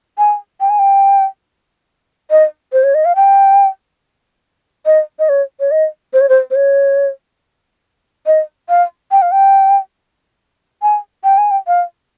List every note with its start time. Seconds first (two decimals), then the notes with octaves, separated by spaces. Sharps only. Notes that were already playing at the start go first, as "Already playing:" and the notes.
0.18 G#5
0.60 G5
0.70 G#5
0.79 G5
2.31 D#5
2.73 C5
2.83 C#5
2.95 D#5
3.05 F5
3.16 G5
4.86 D#5
5.19 D#5
5.29 C#5
5.60 C#5
5.71 D#5
6.13 C5
6.21 C#5
6.29 C5
6.51 C5
6.56 C#5
8.26 D#5
8.69 F5
9.11 G5
9.22 F5
9.32 G5
10.82 G#5
11.24 G5
11.38 G#5
11.51 G5
11.67 F5